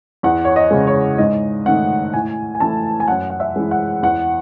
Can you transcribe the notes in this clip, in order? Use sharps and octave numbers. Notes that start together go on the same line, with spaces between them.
E2 F#5
C#5
D#5
C#3 G#3
C#5
G#2 D#5
D#3 A3 F#5
A2 G#5
G#5
E3 A3 A5
G#5
F#2 F#5
F#5
E5
E3 G#3
F#5
E2 F#5